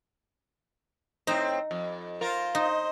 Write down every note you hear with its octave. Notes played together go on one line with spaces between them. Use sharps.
A2 C4 D#4 C5
F2
F4 A#4 C5
D#4 C5 D#5